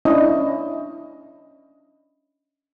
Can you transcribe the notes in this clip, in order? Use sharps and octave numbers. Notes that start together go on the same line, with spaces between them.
C#4 D4 E4 D#5